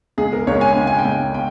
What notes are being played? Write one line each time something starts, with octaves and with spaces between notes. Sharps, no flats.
C#2 G#4
A#4
C#2 C#5
G#5
C#3 G5
G#5
G5
C#2
G5